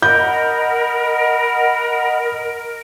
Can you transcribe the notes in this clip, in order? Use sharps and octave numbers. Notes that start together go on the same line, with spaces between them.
A#4 D#5 F#5 B5 G6